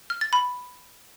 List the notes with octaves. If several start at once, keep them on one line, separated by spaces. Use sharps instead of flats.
F6
A6
B5